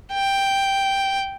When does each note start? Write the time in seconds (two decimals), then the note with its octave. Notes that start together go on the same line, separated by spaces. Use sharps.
0.13 G5